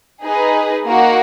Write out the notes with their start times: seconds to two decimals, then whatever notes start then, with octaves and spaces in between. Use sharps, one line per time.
0.23 D#4 G#4 B4
0.85 A#3 D#4 F#4 A#4